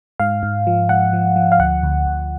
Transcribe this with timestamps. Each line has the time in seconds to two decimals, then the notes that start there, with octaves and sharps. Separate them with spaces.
0.20 G#2 F5
0.43 G#2
0.67 F3
0.89 G#2 F#5
1.13 F3
1.36 F3
1.52 F5
1.59 D2 F#5
1.83 D2
2.06 D2